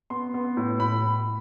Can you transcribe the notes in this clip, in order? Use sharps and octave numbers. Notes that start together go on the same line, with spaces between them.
B3 C6
B3
A2
A2 B5